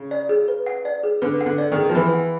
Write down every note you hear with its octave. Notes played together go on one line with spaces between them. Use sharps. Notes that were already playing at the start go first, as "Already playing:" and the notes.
Already playing: C#3
D5
G#4
B4
F#5
D5
G#4
D3 B4
F#5
D3
D5
D#3
G#4
F3
E3 B4
F#5